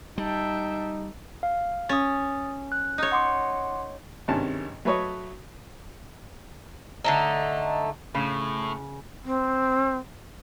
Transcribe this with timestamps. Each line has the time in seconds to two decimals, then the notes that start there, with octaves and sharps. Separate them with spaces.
0.18 G3 D#4 E5 G5 A5
1.43 F5
1.89 C#4 D#6 A6
2.72 F#6
2.98 D#4 C#5
3.12 F#5 C6 D6
4.28 G#1 G2 C3 D#3 C#4 A5
4.85 F#3 A3 B4 C#5 D#5
7.04 D3 A3 D#4
8.15 A2 C#3
9.24 C4